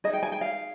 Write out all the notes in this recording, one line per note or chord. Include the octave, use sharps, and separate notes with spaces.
D#4 G#4 D#5
G5
G#5
G5
F5